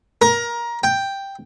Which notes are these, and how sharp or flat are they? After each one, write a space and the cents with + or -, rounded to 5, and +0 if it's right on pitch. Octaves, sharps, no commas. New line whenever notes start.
A#4 +20
G5 +5